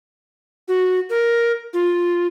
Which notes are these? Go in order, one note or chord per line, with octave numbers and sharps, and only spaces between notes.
F#4
A#4
F4